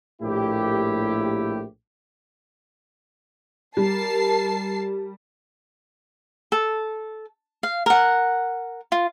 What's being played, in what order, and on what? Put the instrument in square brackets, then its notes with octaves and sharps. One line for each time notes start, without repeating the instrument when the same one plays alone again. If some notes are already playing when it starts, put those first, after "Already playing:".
[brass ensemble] A#1 A2 A#3 E4 G4
[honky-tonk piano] G3 [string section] A#4 A5 C7
[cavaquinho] A4
F5
A#4 F#5
F4